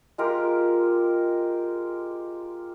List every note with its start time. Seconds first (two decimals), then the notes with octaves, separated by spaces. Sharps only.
0.18 G#3 F4 G4 A#4